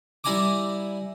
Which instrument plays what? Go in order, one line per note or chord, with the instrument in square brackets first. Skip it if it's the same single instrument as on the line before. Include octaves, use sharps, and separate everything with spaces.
[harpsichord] G3 E4 G#5 A#5 D6